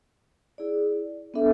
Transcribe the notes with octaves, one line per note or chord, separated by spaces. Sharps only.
E4 G#4 D5
B3 D4 A4 E5